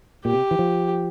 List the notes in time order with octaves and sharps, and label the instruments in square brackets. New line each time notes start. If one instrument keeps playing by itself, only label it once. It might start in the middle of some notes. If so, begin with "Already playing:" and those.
[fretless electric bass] A#2 [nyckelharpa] G4
[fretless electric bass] C3
E3
F3